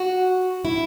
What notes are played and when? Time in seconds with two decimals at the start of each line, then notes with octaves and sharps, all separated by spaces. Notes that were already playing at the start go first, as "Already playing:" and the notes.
Already playing: F#4
0.65 E4